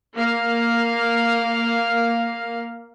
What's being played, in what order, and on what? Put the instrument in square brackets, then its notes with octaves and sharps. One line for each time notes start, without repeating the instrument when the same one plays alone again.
[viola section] A#3 F5